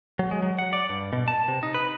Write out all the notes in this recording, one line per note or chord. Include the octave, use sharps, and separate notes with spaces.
F#3
G#3
F#3
F#5
D5
G2
B2
A5
C3
D#4
B4